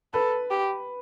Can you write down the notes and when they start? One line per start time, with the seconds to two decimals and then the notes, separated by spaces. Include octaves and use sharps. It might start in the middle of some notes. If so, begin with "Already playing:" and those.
0.14 A4 B4
0.51 G4